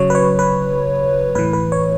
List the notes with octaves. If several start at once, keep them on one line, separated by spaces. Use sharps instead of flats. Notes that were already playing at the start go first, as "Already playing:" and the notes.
Already playing: C#3 F#3 C#5
B4
C#5
B4
A2 E3 B4
B4
C#5